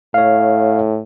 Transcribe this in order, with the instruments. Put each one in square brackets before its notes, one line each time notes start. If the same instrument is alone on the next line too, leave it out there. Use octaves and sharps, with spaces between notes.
[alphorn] A2 [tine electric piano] C#5 F5